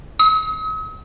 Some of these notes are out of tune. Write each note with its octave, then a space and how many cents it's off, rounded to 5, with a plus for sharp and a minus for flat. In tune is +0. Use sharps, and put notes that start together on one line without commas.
D#6 +45